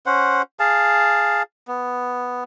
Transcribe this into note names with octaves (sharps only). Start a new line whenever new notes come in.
C#4 C5 F#5
G#4 F5 A5
B3